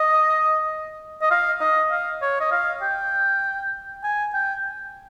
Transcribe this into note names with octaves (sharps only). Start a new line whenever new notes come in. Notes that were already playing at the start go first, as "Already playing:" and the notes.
Already playing: D#5
D#5
F5
D#5
F5
C#5
D#5
F5
G5
G#5
G5